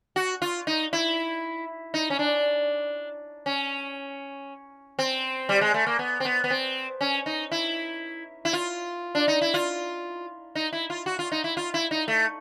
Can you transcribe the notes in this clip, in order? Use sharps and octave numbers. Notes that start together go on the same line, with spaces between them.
F#4
F4
D#4
E4
D#4
C#4
D4
C#4
C4
G3
G#3
A3
A#3
B3
C4
B3
B3
C4
C#4
D#4
E4
E4
F4
D4
D#4
E4
F4
D#4
E4
F4
F#4
F4
D#4
E4
F4
E4
D#4
A3